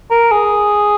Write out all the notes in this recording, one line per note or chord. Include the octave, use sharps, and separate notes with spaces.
A#4
G#4